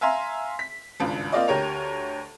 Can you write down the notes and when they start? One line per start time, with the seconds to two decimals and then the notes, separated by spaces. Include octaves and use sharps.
0.01 E5 F5 G#5 A#5 C6
0.59 B6
1.00 G#1 C#2 G2
1.32 A#3 C4 F4 D5 D#5
1.48 D2 G4 A#4 C#5 F7